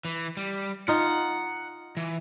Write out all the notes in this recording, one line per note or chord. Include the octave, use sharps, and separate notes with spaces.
E3
G3
D#4 F4 F#5
E3